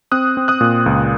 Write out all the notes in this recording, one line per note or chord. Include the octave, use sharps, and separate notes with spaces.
C4 D#6 F#6
C4
D#6 F#6
A#2
C#2